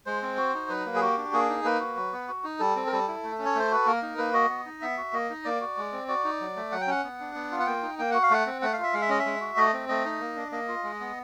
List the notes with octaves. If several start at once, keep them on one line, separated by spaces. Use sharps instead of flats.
G#3 C5
C4
F#4
D#4
F#3 B4
A#3
G#4
F#4 G4
D4
A#3 G#4
D#4
A#3 B4
F#4
F#3
B3
F#4
D#4
G3 A4
C4
A#4
G3 A4
E4
A3
C#4
C#5
A3 C5
F#4 B4
A#3 A#4
D#4
A#3 B4
F#4 D#5
B3
D#4
B3 E5
F#4
A#3 D#5
D#4
A#3 D5
F#4
G#3
C4
F#4 D5
D#4
F#3
A3
F#3 F#5
G5
C#4 F#5
B3
D4
B3
F4
F#5
A#3 G5
D#4
A#3 G5
F#4 F#5
F5
A3 F#5
C4
A3 F#5
F5
F4 E5
G#3 F5
E5
C#4 D#5
E5
G#3
F#4
A3 D#5
C4
A3 D#5
D#4
A#3
D4
A#3 D#5
F4
G#3
B3